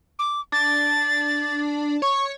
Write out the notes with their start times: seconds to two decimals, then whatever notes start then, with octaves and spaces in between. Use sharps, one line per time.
0.19 D6
0.52 D4 A6
2.02 C#5 C#6